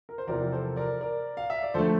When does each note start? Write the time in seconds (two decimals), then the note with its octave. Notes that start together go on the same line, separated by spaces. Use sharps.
0.09 A#4
0.18 C5
0.27 E2 C3 F3 A#4 D5
0.52 A4 C5
0.76 A#4 D5
1.01 A#4 D5
1.37 F5
1.50 E5
1.63 D5
1.74 F2 D3 A3 A4 C5